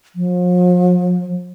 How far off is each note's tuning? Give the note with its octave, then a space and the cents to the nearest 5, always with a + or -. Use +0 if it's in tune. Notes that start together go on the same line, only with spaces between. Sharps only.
F3 +40